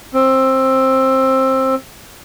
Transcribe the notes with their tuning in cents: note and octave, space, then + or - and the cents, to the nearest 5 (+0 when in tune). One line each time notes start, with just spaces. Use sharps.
C4 +15